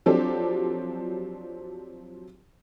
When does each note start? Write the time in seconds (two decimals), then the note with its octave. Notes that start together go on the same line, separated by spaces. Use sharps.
0.06 F3 F#3 C4 D4 G4 A4